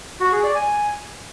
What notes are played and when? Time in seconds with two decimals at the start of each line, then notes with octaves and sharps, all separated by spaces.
0.20 F#4
0.32 G#4
0.44 D5
0.55 G#5